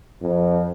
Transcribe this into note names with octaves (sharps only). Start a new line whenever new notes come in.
F2